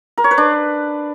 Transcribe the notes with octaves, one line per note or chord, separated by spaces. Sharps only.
A#4
C#5
B4
D4